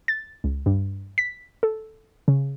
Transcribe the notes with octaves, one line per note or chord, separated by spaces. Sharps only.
A6
C#2
G2
B6
A4
C#3